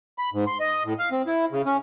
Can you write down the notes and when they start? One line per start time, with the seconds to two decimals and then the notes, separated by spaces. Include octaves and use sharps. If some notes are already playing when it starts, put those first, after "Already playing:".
0.18 B5
0.33 G#2
0.47 C6
0.60 D#5
0.85 A2
0.99 F5
1.11 C4
1.27 E4
1.52 C#3
1.66 C#4